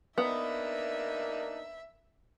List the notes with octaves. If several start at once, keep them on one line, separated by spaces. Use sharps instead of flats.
A#3 B3 D4 D#4 E5